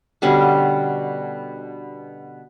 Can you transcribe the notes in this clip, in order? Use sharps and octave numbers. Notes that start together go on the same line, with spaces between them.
B2 D3 G3 C#4